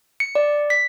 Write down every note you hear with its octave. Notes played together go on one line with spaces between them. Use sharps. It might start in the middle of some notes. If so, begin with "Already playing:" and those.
C#7
D5
B6